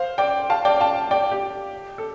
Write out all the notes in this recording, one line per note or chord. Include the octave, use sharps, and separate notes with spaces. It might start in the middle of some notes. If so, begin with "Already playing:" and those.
Already playing: C5 F5
D5 G5
F5 A5
D5 G5
F5 A5
D5 G5
G4
A4